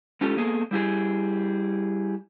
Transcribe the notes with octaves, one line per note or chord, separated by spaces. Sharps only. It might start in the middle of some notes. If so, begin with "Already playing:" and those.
G#3 C#4 D#4 F4 G4 A4
A#3 B3 G#4 A4
G3 E4 G4 G#4